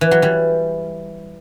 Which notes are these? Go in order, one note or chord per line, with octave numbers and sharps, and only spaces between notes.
E3
F#3
E3 G3